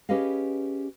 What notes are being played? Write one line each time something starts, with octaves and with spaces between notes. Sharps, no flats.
C#4 G4 G#4 B4 D#5 F5